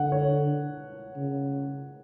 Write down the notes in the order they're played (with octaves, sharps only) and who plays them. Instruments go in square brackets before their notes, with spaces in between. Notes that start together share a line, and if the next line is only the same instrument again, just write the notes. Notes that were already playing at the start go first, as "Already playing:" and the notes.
Already playing: [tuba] D3 [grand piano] F#5
[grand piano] C#5
[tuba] C#3